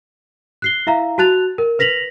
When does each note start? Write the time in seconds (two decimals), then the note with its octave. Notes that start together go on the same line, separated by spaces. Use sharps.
0.62 F#6 C7 G7
0.87 E4 E5 F5 A#5
1.18 F#4 A5 F#6 A6 F7
1.58 A#4
1.79 B4 A#6 B6 F7 F#7